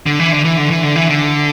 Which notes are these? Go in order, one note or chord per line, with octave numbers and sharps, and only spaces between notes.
D3
E3
D3
E3
D3
E3
D3
E3
D3